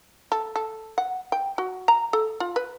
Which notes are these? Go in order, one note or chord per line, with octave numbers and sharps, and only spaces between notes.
A4
A4
F#5
G5
F#4
A#5
A4
F4
B4